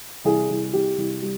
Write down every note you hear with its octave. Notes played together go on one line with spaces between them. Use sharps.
C2 G#4
C2
C2 G4
C2
G3